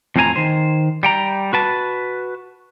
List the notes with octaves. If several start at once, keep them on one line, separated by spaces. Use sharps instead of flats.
F2 A2 C4 E4 G#5 A#5
D#3 C5
G3 G5 A#5
F#4 B4 A5